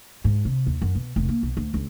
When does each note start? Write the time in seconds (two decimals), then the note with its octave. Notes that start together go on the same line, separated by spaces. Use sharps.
0.24 G#2
0.45 C3
0.66 D#2
0.82 F#2
0.95 B2
1.16 F1
1.29 A#3
1.43 B1
1.57 D2
1.74 C#2